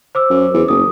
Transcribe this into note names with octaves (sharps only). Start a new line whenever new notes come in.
C5 D6 E6
F#2
E2
F#1 D#6